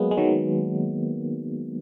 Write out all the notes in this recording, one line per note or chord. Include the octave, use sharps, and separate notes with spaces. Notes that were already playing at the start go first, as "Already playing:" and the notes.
Already playing: F#3 G#3 A#3 B3
G#3
D#3 F#3